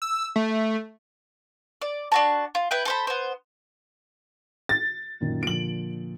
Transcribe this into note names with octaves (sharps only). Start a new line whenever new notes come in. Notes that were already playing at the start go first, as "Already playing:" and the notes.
E6
A3
D5
D4 F#4 A5
F4
E4 B4 G5
A4 C5 B5
B3 C5
A6
F#2 A#2 D#3
A#2 D3 F3 D7 F#7